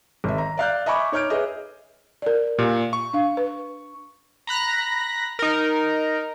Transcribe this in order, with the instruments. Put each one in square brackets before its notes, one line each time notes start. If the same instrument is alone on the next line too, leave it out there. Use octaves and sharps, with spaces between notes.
[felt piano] G#1 E5
A#5
D5 F5 F#6 G6
D#5 E5 G#5 B5 C#6 D6
D#4 C#5 D6 F6 G6 D7
G#4 B4 C#5 D#5 E5
[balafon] A#4 D5
[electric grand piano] A#2 [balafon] G4
[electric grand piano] C#6
[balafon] D4 F5
B4
[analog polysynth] A#5 B5 F#6 A#6
D#4 A#4